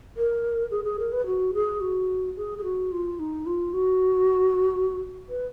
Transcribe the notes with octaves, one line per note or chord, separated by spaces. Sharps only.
A#4
G#4
G#4
A#4
B4
F#4
G#4
F#4
G#4
G#4
F#4
F4
D#4
F4
F#4
B4